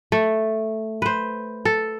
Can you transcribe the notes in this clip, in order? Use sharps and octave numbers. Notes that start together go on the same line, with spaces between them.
A3
B4 C5
A4